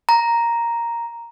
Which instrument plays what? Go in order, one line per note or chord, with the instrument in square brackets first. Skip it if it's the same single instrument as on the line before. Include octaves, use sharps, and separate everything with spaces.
[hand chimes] A#5